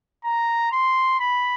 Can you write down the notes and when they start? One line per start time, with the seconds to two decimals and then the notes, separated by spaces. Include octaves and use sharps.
0.24 A#5
0.72 C6
1.19 B5